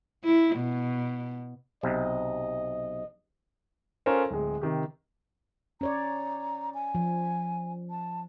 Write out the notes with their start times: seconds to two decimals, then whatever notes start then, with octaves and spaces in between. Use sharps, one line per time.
0.24 E4
0.56 B2
1.83 B1 C3 D#5
4.06 C#4 F4 A4 A#4 C5
4.30 D1 G#3
4.61 C3 D#3 G4
5.81 C#4 C#5 D5 A#5
6.74 G#5
6.95 F3
7.90 A5